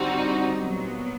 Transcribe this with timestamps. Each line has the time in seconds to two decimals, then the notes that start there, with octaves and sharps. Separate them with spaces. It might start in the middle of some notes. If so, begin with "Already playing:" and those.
Already playing: D3 G3 C4 D#4 F#4
0.59 A#2 F#3 B3